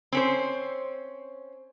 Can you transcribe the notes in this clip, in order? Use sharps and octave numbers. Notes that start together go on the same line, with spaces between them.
C4 C#4 C5